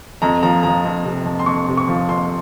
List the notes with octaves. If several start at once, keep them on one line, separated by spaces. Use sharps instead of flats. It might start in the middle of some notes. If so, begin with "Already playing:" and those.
F2 A#5
F3 A#5
F3 A#5
F2
C3
F2
C6
F2 C#6
C3
C#6
F3
F2 C6